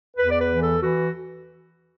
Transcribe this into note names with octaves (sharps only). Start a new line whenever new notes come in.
E2 B4
D5
B4
E3
A4
E3 F#4